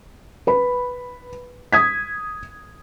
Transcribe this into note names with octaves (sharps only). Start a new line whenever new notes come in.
B4 B5
D#6 G#6 B6